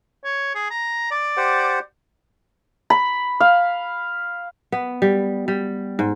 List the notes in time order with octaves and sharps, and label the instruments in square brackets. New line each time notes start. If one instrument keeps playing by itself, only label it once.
[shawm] C#5
G#4
A#5
D5
[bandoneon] G4 C5 F#5
[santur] B5
F5
[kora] B3
G3
G3
G#2